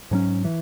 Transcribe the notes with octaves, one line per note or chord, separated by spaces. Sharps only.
G#2 F#3 C#4
E3